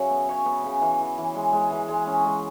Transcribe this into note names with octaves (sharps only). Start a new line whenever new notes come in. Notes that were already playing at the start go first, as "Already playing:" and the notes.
Already playing: C#3 F#3 F#4 C#5 E5
B3
C#3 C#5
B3
C#3
E3
E3
E3
G#3
G#3
E3
G#3
C#4
G#3